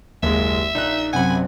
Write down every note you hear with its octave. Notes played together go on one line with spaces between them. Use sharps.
F#1 D#2 G#3 E5
A#1 D#4 F#6
F#2 C3 F#5 G#5 B5